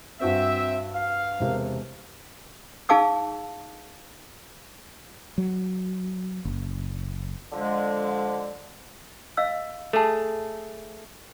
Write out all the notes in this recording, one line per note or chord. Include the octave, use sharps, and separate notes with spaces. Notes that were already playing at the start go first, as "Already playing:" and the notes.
G2 C4 F#4 C5 E5
F5
E1 C3 A#4
D#4 G#4 F5 A5 D6 E6
F#3
F#1
D3 F3 G#3
D#5 F5 E6
A3 G#4 A4 A5